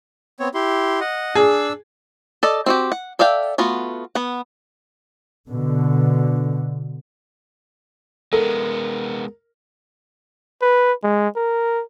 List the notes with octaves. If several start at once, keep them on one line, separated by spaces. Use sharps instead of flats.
B3 C4 C#5
E4 G4 C6
D#5 F#5
D4 G#4 E6
A4 D5 D#5
C4 F#4 G4
F#5
A4 D5 E5 F5 G5
A3 B3 F4 F#4
B3 F#5
B2 D3
G#3 B3 A4 A#4
B4
G#3
A#4